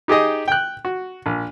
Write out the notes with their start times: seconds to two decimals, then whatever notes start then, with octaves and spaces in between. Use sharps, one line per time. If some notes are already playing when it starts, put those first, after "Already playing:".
0.08 D#4 G4 G#4 D#5
0.48 G5 F#6
0.85 F#4
1.26 A#1